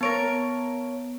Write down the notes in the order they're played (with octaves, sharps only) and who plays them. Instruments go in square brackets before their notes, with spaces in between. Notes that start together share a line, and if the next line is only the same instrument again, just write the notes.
[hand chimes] B3 D7 [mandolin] A#4 C#5 A5